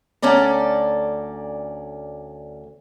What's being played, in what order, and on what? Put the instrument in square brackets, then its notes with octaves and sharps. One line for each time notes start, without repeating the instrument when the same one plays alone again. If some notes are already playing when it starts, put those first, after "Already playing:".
[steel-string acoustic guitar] D2 C#4 A4 D5 A#5